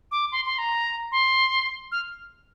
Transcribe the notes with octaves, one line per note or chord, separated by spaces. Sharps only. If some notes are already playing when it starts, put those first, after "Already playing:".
D6
C6
C6
A#5
C6
F6